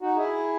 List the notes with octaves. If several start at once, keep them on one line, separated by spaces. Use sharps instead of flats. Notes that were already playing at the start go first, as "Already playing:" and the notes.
D#4 F#4
E4 G#4